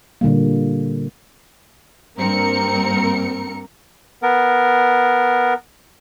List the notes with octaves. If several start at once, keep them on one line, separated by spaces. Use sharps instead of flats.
A#2 D3 G3 A#3
G2 A#3 C4 A#4 C#7
B3 A#4